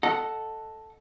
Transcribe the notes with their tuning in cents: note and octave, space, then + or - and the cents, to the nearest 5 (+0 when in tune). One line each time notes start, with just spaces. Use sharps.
A4 +0 D#5 +0 F#5 +0